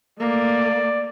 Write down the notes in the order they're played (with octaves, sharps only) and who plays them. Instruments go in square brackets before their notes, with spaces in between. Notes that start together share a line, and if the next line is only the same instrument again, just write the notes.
[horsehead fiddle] A3 A#3 [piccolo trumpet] D5